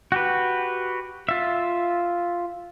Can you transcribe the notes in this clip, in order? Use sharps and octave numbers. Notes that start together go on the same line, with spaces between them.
F#4 G4 B4
F4 E5